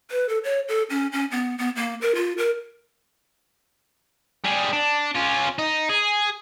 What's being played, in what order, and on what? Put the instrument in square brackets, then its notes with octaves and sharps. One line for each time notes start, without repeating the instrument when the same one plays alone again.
[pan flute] B4
A4
C#5
A4
C#4
C#4
B3
B3
A#3
A#4
F4
A#4
[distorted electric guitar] G3 G#4
D4
C#4 F4
D#4
G#4